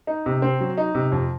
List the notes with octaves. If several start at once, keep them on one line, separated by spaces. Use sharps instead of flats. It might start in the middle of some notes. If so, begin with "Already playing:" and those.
D#4
C3
C4
F#3
D#4
C3
F2